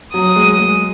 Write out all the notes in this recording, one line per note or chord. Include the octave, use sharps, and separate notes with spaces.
F#3 D#6
G#3
G#3